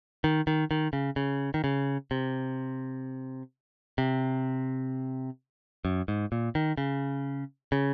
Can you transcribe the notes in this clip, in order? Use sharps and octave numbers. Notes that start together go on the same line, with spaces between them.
D#3
D#3
D#3
C#3
C#3
D#3
C#3
C3
C3
F#2
G#2
A#2
D#3
C#3
C#3